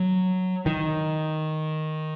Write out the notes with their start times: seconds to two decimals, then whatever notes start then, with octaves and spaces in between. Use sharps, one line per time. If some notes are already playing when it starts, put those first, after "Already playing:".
Already playing: F#3
0.66 D#3